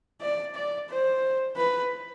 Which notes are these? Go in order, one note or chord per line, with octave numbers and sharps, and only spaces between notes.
D5
D5
C5
B4